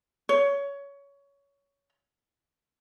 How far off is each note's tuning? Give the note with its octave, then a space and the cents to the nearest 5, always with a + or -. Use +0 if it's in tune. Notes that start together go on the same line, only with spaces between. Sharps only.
C#5 +20